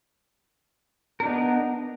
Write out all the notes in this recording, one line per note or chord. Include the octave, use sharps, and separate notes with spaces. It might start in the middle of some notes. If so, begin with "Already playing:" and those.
B3 D4 D#4 A#4